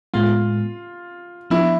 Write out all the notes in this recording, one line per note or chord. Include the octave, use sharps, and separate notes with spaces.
A2 G#3 B3 F4
F3 B3 D4 E4